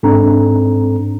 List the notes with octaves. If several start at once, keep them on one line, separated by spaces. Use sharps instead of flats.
G#2 C4 D4 A4 A#5